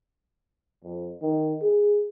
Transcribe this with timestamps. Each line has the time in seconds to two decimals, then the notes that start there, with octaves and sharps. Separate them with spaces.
0.84 F2
1.22 D#3
1.61 G#4